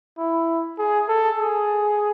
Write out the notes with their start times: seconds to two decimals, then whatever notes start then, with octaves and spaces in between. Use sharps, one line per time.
0.18 E4
0.78 G#4
1.08 A4
1.39 G#4